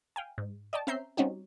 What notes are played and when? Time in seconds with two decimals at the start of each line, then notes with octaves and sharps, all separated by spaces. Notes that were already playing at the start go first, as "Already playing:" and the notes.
0.16 F5 G5 G#5
0.38 G#2
0.73 D5 D#5 G5 A5
0.87 C4 C#4 E5 A#5 G6 C7
1.17 G3 C4 C#4 D#4 F#4 G4